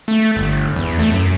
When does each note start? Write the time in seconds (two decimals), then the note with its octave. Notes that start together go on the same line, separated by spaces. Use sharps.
0.08 A3
0.36 G1
0.76 E2
0.99 A3
1.12 F#2